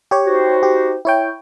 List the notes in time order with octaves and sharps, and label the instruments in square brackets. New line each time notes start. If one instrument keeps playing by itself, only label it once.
[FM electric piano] G4 C#5
[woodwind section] D#4 F#4 C5
[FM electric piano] G4
E4 C#5 G5